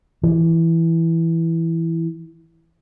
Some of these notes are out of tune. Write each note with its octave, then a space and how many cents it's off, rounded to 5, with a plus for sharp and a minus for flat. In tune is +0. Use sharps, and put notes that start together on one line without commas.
E3 +0